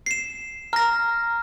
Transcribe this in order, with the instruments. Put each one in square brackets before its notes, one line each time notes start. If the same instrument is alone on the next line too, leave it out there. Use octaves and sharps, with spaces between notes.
[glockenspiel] C7 E7
[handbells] A#5 [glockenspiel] F6 A#6